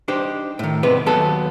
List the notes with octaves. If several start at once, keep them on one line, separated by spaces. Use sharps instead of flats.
D4 D#4 G4 C5
A2 D#3
D#2 G#2 C3 B3 B4 D5
D#2 F#3 B3 G4 A4 A5